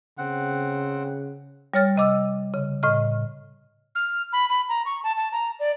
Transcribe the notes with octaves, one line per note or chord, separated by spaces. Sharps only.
C#3 C4 F#5
G3 C#5 F6 A6
C3 D#5 D6 E6
C#3
A2 D#5 F6
F6
B5
B5
A#5
C#6
A5
A5
A#5
D5